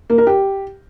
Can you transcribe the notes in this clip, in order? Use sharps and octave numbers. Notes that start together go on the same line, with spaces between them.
A#3
A#4
G4